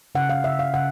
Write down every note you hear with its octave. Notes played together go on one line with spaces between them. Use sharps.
C#3 F#5
F5
C#3 E5
F5
C#3 F#5